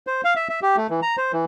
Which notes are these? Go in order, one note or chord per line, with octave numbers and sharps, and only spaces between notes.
C5
F5
E5
E5
G4
A3
E3
A#5
C5
E3